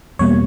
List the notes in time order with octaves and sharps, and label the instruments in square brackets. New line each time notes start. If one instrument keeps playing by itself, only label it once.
[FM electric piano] E2 B2 G3 A#3 C#5